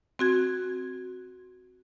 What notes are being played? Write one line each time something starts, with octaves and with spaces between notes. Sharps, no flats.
C4 F#4 G#6